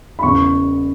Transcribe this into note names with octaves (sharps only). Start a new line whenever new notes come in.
B5
E1 E2 C#3 C#6